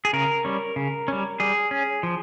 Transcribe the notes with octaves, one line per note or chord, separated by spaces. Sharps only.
G#4
C#3 A#4
G3 C#4
C#3
G3 C#4
G3 G#4
C#4
F3